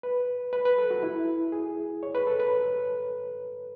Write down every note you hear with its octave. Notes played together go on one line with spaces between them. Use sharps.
B4
B4
B4
A4
F#4
E4
G#4
C#5
B4
A4
B4